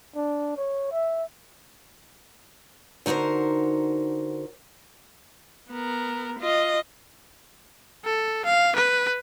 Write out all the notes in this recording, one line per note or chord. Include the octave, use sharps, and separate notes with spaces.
D4
C#5
E5
D3 D#4 F#4 A#4 C5
B3 A#4
F4 D#5
A4
F5
B4